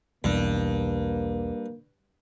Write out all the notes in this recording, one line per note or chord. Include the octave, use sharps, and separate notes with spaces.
B1 E2 G2 B2 A#3